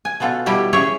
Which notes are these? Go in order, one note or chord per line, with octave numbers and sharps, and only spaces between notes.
G#5
B2 B3 F4 A4
B2 G3 E4 G4 D#5
C#4 G#4 C#5 E5 G5